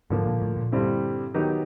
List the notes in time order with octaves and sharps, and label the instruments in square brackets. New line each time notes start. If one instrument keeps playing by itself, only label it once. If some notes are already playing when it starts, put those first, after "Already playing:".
[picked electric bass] G#2 [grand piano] D3 F3 A#3
[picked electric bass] A#2
A2
A#2
[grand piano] G2 D3 G3 C4 E4
D#3 F#3 B3 D#4 G4